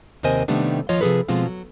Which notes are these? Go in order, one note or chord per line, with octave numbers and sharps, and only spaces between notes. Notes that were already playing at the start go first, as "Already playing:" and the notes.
D#2 C3 A#4 C5 D#5 G#5
C3 D#3 G3 A3 B3 D4
D#2 F3 F4 C#5 D#5
C3 F3 B3 G#4 A4 B4
B2 F3 G#3 C4 F4
F#3